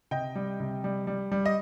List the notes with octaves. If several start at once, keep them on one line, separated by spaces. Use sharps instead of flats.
C3 D#5 G5
G3
C3
G3
G3
G3
D#5